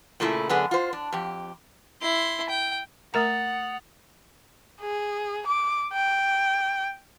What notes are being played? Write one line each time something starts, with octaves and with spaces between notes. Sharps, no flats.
A#2 C#3 A3 E4
F#2 D3 B3 D4 G#4
F4 C5
D4
F2 G4
E4 C6
G5
A3 A#4 F#5 A#5 D#6 A6 F7
G#4
D6
G5